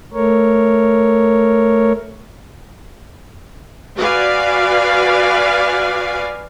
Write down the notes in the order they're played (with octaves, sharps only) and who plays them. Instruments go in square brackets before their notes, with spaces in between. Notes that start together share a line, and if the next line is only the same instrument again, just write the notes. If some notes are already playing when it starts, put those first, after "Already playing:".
[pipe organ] A3 A#4 C#5
[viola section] F#4 B4 D5 F5 G#5